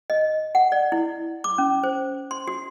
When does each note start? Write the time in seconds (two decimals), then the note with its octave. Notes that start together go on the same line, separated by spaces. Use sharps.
0.10 D#5
0.55 F#5
0.72 D5
0.92 E4
1.44 D6
1.58 C#4
1.84 C5
2.31 C6
2.47 F#4